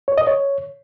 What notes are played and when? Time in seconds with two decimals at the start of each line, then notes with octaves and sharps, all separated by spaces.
0.08 C#5
0.18 D#5
0.27 C#5